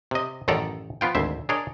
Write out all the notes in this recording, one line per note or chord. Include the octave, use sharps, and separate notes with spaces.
C3 D#5
A1 F#2 D#3 A4 D5 A#5
F3 B3 F4 G5
G#1 D2 C5 E5
D4 G#4 A#4 C#5 D#5